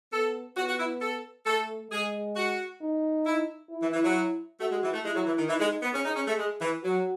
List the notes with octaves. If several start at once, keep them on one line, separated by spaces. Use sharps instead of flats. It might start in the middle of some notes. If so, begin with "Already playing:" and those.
B3 A4
B3 F#4
F#4
E4
A4
A3 A4
G#3 G#4
F#4
D#4
E4
E4
E3
E3
F#3
A3 F#4
G#3
E3
A3
G#3 E4
F#3
E3
D#3
E3 D#4
G#3
B3
C#4 G#4
D#4
C#4
A3
G#3
E3
F#3 F#4